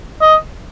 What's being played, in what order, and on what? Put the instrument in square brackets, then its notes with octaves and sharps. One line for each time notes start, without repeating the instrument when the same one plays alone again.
[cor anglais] D#5